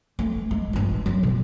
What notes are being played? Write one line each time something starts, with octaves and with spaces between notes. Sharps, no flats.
A3
G#3
G2 F4
F#3
B2